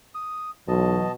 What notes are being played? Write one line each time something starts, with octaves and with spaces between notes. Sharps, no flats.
D#6
B1 B2 E3 F#3 D#5 A5